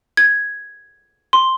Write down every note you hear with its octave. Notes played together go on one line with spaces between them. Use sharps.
G#6
C6